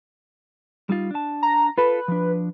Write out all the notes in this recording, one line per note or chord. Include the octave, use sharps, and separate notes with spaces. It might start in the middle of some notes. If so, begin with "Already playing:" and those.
G3 D#4 F4
D4 A5
A#5
F4 A4 B4
F3 D4